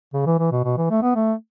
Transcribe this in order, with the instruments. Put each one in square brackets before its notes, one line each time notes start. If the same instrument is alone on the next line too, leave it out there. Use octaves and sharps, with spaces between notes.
[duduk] C#3
E3
E3
B2
B2
E3
A3
B3
A3